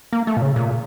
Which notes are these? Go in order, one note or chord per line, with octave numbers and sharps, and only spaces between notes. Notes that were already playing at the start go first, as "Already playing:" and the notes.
A#3
A3
A#2
C#3
A#2